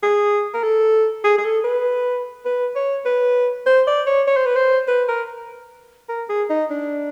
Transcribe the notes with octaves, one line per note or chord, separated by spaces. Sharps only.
G#4
A#4
A4
G#4
G#4
A4
B4
B4
C#5
B4
C5
D5
C#5
C#5
C5
B4
C5
B4
A#4
A#4
G#4
D#4
D4